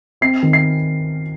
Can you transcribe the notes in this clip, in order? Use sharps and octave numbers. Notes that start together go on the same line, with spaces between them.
C4 C7
D#3
C7